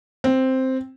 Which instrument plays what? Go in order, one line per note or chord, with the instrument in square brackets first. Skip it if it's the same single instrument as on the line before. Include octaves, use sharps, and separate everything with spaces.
[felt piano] C4